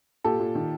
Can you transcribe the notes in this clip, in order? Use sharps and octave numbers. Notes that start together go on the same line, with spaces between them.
A#2 G4 A4
A#2
D#3